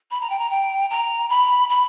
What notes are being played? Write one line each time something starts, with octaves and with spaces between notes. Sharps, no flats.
B5
A#5
G5
A#5
G5
A#5
B5
B5